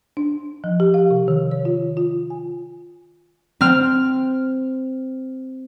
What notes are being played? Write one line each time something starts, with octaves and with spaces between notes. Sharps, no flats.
D4
F3
G4
F5
C3
D#3
C#5
F4
F4
G#5
C4 F6